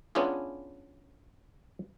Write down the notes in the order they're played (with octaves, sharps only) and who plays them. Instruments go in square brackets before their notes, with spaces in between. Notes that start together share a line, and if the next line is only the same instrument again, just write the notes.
[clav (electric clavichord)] B3 C#4 D4 E4 F4 G#4